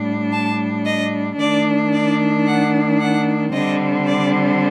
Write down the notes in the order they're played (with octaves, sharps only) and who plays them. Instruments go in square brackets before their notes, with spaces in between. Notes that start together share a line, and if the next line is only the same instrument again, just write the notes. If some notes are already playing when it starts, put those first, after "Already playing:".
Already playing: [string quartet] A2 G3 D4
A5
D#5
D#3 A3 D4 D5
D5
F#5
F#5
D3 G3 C4 D#5
D5